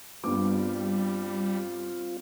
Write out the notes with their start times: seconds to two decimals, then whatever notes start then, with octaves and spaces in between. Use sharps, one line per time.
0.24 G2 G3 B3 C4 F4 D6